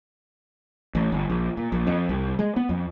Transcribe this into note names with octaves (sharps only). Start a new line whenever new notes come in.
A1
G1
A#1
A#2
A#1
F2
C2
G#3
B3
F2